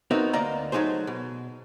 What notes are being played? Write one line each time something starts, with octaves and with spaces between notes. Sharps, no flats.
B3 C4 D#4 F#4 A#4 E5
D2 A#3 D5 D#5 A#5
F#3 A3 D#4 G#4 C5
B2